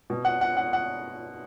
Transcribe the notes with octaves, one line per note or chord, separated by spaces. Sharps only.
B2
F#5
F#5
F#5
F#5